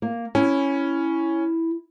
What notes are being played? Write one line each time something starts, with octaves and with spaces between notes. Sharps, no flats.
A#3
C#4 E4 G#5